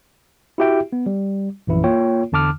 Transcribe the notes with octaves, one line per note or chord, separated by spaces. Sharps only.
E4 F#4 G4 E5 G5
B3
G3
A#1 F#2 E3 E4
A#3 F4 C#5 G5
E2 D3 A5 D6 F6